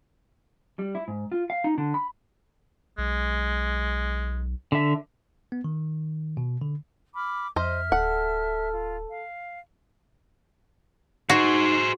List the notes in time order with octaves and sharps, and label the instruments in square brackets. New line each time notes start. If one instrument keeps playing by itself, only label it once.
[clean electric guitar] G3
E4
G#2
F4
F5
D#4
D3
B5
[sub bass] B1 [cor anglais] G#3
[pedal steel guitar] D3 E5
[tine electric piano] B3
D#3
B2
D3
[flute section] B5 D6 F6
[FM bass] F2 [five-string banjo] C5 D#5 [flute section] E5 F6
[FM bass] D1 [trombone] A4 [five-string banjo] F#5
[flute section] F4
F5
[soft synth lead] D#4 [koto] F#4 [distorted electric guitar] G#4 C5